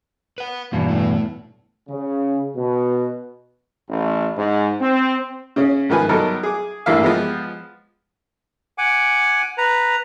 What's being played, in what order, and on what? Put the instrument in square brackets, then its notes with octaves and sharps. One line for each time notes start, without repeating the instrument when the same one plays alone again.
[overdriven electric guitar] B4 F#5
[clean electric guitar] E2 G2 B2 [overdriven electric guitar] A#3
[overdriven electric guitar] A3 E4
[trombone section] C#3
B2
A1
G#2
C4
[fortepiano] C#3 C#4
G#2 D#3 F3 B4 G#5
F#3 G3 B3 D#4 A4 A#4
G#4 D6
A1 G2 E3 A#3 E5 F5
F3 G#3 B3 G4
[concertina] F#5 G#5 D6
B4 A#5